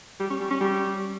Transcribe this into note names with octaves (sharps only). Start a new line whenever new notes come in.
G3
C#4
G3
C#4
G3